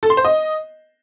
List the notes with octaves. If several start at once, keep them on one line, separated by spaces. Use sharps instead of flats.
A4
C6
C5
D#5